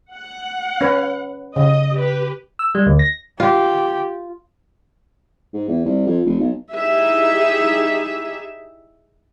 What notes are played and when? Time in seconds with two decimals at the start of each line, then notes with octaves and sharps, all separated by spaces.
0.14 F#5
0.81 C#4 B4
1.56 C#3 D#5
1.95 G4 B4
2.59 E6
2.75 G3
2.86 D2
2.99 A#6
3.40 F4 G4
5.54 G#2
5.68 E2
5.85 C2
6.06 F2
6.26 F1
6.40 B1
6.73 D#4 E4 G4 G#4 E5